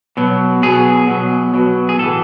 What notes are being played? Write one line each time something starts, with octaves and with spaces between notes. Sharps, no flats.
B2 F#3
B2 F#3 G#4
B2 F#3
B2 F#3
G#4
A2 E3 A4